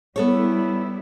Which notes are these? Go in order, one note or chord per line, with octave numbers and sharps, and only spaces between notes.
G3 B3 E4 A4 C#5